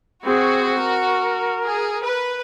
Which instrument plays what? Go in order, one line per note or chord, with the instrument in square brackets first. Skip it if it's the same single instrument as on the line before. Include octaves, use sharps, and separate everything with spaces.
[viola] C4 G#4 [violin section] F#4
[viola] A#4
[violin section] G#4
B4